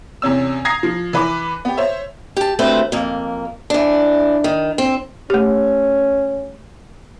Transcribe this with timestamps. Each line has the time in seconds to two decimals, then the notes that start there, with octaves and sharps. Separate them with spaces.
0.22 E2 C3 C#4 E6
0.65 A#5 D#6 G#6 A#6 C7
0.83 F3
1.13 E3 B4 D6
1.65 B3 G4
1.77 C5 C#5 E5
2.37 G4 A5
2.59 D2 A3 C4 B4 C5
2.92 F2 A#3
3.70 E3 D4
4.44 D#3
4.78 C4
5.30 A3 C#4 G4